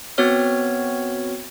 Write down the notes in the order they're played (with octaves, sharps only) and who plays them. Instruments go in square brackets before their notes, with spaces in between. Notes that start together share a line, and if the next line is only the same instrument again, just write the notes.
[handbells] B3 C4 F#4 C#5 F6